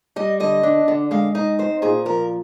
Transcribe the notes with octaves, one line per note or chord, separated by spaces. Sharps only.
G3 D#5
D3 D#5
D4
D3
G#3 F5
D#4 D#5
C4 C5
A#2 G#4
F3 A#4